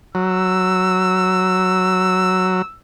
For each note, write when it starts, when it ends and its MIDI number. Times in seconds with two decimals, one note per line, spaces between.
0.15 2.62 54
0.15 2.77 88